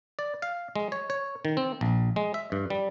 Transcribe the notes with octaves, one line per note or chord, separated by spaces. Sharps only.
D5
F5
G#3
C#5
C#5
D#3
C4
A#1
G#3
E5
G2
G3